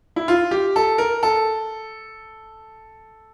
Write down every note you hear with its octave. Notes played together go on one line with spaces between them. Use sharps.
E4
F4
G4
A4
A#4
A4